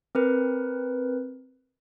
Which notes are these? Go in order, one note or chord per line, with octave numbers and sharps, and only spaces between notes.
C4 A#4 B4